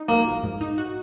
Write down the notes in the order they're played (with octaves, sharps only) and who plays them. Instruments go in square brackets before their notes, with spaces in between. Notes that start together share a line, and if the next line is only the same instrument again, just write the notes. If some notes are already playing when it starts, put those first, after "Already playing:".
Already playing: [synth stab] D#4
[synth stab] F#3 [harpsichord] A#3
[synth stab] A#1
G#2
D#4
F#4